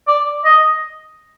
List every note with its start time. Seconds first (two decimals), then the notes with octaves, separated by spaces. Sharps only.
0.08 D5
0.45 D#5